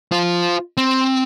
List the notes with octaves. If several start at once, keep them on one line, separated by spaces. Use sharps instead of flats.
F4 C5
C4